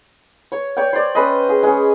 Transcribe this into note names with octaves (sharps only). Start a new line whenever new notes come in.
C#5
C#5 D5 G5
C5 D5
C#4 B4 C5 D#5
G#4
G#3 C#4